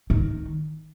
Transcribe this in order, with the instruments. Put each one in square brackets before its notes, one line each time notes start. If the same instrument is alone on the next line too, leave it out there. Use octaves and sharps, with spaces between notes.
[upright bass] D#3